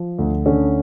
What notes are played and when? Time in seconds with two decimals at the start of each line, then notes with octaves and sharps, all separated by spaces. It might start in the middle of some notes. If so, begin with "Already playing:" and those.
Already playing: F3
0.19 D2
0.46 D3 C#4